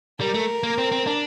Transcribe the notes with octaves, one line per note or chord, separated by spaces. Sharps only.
G3 A#4
A3
A#3
C4
C4
D4